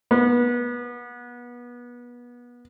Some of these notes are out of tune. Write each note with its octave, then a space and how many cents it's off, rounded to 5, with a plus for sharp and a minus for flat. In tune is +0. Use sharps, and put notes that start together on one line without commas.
B3 -25